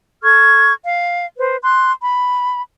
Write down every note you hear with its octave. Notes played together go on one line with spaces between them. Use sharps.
A4 C#6 F6 G#6
F5
B4 C5
C6 F#6
B5